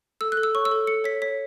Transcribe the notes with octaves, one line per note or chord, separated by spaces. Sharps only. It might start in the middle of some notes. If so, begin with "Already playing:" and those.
A4 E6
F#6
A4
E6
C#5 C#6
E6
A4
A4 C#7
C#5 B6
C#5 B6